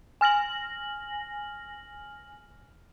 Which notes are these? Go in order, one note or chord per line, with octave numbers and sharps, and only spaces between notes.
G#5 F6 A#6 F#7